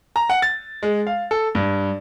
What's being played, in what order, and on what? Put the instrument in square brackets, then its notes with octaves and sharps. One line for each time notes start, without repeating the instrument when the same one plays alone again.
[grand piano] A#5
F#5
A6
G#3
F5
A4
G2